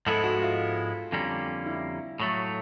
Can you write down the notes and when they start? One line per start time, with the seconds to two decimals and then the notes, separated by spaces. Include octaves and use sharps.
0.06 G#2 F3 G#3 B3 E4 A4
0.24 F#4
0.42 F4
1.12 F2 D3 G3 A#3 C#4
1.66 E4
2.20 A2 F#3 A3